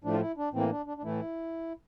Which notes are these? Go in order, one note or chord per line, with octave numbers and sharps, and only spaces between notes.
A2 F3 A3 D4
F4
E4
D4
A2 E3 A#3 C4
D4
D4
D4
A2 E3 A3 E4